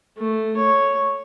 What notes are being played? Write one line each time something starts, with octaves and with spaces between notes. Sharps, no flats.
A3
C#5